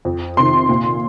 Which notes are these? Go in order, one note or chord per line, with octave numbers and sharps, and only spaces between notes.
F2
C3 D#3 C6
A#2